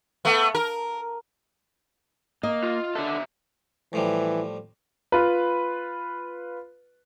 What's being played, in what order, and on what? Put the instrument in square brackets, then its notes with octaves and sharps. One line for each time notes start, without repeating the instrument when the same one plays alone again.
[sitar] A3 B3
A#4
[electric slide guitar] A#3 [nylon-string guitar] D#5
[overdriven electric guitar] F4
[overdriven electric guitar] C#3 E5 [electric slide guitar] D4 A4
[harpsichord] A2 F3 G3 [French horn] E3
[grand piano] F4 B4